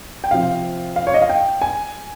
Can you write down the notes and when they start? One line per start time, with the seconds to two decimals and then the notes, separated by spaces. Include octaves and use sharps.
0.24 G5
0.31 C3 F3 C4 F5
0.96 F5
1.07 C#5
1.14 D#5
1.22 F5
1.29 G5
1.62 G#5